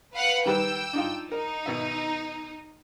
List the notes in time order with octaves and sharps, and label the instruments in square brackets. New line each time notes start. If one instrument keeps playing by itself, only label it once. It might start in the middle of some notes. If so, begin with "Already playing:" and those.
[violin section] B4 F5 F#5
[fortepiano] D#3 G3 B4 [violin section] G5 E6
[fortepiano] D4 D#4 F4
[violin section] D#4 [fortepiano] A#4
[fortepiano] B2 D#3 E5